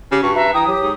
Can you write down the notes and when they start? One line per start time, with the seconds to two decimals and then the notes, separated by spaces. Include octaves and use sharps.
0.12 C#3 G4
0.23 G2 F#4 C#6
0.35 B4 E5 A#5
0.54 E3 G5 A#5 D#6
0.67 F#3 G4
0.82 G#2